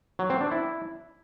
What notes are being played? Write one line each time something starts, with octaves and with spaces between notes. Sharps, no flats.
F#3
C4
D4
E4